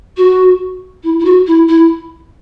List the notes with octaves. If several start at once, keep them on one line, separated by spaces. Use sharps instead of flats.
F#4
E4
E4
F#4
E4
E4